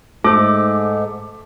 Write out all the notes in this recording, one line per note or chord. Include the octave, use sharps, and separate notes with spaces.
G#2 A3 A4 C5 D6